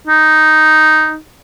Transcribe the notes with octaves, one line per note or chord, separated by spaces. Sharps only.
D#4